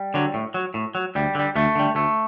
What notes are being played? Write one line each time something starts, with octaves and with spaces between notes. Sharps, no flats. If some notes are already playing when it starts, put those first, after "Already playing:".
Already playing: G3
D3 F#3
A2
F#3
A2
F#3
D2 G3
D3 G3
D2 A3
D3 G3
D2 A3